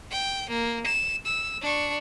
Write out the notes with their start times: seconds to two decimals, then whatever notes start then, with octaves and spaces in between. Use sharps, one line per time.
0.11 G5
0.49 A#3
0.86 E7
1.25 E6
1.62 D4 C#6